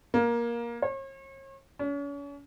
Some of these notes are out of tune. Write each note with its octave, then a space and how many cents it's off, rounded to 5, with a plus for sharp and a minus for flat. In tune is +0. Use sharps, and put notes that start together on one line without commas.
A#3 +15
C#5 -40
C#4 +40